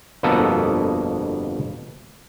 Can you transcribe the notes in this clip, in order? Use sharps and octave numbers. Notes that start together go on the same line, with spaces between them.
G1 F2 B2 A#3 B3 A4